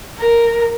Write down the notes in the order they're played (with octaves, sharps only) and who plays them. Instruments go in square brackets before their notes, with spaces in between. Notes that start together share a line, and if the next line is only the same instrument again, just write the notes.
[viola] A#4